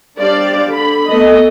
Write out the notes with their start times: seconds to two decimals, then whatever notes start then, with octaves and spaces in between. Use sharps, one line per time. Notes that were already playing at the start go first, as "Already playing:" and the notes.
0.19 G3 D4 G4 C5 D5 F5
0.68 D3 B5
1.08 A3 B3 A4 D#5